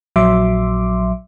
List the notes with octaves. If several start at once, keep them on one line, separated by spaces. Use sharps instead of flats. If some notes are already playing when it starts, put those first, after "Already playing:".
A#1 F#3 E5 C6 D6